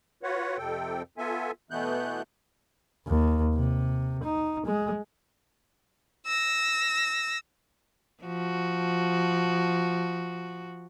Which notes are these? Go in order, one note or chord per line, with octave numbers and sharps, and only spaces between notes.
F4 F#4 B4 C#5 F#5
F2 C3 A4 G5
B3 F4 A4 E5 G#5
B2 E3 A3 B3 F#6 G6
D#2
C3
D#4
G#3
E6 A#6
F3 F#4